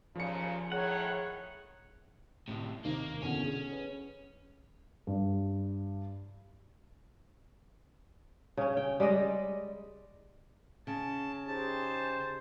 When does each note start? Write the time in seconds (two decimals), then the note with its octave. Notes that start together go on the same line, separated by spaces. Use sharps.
0.15 D#2 A#2 C#3 F3 C#7
0.72 A2 D#3 G#4 C#5 F#5
2.48 A2 C3
2.84 D#2 C3 D#3 A#3
3.22 E2 B2 D3 C#4
3.45 G#4
3.72 B4
5.07 G2
8.57 C#3 C#4
8.77 G5
9.00 G3 G#3 D5 D#5
10.87 C#3 A5
11.47 D#4 G4 G#4 C5 A5